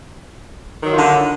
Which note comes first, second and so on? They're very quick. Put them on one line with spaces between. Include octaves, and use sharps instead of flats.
D#3 F#3 F4 D#4 D3